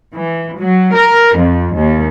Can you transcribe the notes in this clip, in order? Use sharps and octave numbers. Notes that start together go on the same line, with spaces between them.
E3
F#3
A#4
F2
D#2